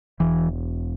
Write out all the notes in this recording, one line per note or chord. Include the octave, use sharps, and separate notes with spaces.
E1 E3